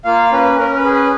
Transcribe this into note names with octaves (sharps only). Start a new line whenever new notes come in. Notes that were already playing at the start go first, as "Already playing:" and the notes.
A#3 F4 F5
C#4 B4
C#4 A#4
B4
G#4
B4